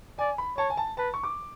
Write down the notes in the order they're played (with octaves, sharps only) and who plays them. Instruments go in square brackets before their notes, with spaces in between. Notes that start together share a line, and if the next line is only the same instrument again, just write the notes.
[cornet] D5 [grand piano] G#5
[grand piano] B5
[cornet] C#5 [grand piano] A5
[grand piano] G#5
A5
[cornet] B4 [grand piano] A5
[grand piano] C#6
D6